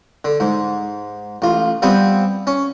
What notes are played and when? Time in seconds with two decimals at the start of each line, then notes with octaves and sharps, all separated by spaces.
0.25 D3
0.40 G#2
1.42 A1 F4
1.82 F3 G3 B3 C4
2.47 C#4